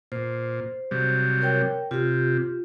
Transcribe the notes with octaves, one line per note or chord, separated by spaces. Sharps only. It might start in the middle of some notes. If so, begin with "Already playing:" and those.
A#2 C5
C3 F#3 G3
A#4 C#5 G5
C3 F4 G4